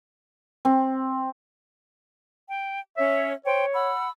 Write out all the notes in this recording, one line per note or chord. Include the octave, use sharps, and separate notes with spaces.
C4
G5
C#4 C#5 E5
C5 C#5 G5
F#5 B5 E6